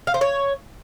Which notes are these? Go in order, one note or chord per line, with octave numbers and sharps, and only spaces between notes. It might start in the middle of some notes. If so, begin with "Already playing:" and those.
F5
C5
C#5